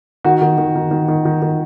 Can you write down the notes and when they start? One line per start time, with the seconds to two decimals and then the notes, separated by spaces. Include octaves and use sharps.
0.24 D#3 F#4
0.41 D#3
0.58 D#3
0.75 D#3
0.91 D#3
1.08 D#3
1.25 D#3
1.42 D#3